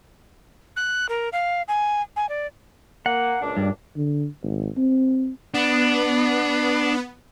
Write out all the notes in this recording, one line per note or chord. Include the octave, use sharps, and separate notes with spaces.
F#6
A#4
F5
G#5
G#5
D5
A#3 F#5
C#2 A#2 D4
G2
D3
G#1
C4
B3 D4